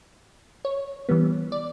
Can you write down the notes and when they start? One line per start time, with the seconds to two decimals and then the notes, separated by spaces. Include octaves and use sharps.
0.65 C#5
1.09 E3 G3 B3
1.52 D5